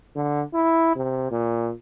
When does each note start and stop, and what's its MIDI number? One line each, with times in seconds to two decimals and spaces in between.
0.16 0.42 50
0.54 0.96 64
0.96 1.26 48
1.31 1.71 46